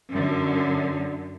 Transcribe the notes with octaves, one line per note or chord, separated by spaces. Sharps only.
F#2 D3